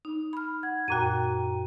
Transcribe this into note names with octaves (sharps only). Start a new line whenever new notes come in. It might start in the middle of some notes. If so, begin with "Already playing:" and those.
D#4
B5 F6
F#5 G#6
F#2 A#2 F#4 G5 A#5 D#7